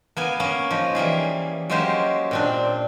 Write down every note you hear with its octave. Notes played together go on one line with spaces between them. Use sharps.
A#3 B3 G#5
A#3 C#4
F3 D#4
E3 G3 A#3 G#4
F#3 G#3 A#3 C#4 G4 C5
A#2 C4 D4